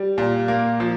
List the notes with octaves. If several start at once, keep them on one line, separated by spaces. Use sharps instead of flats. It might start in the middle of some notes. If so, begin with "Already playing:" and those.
Already playing: G3
A#2
A#3
F3